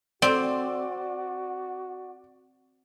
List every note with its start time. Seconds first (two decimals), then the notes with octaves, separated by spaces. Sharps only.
0.22 C4 F#4 D5